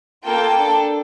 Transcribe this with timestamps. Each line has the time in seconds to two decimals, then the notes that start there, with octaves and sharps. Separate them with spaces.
0.25 A#3 F4 A4 G5
0.56 D4 A4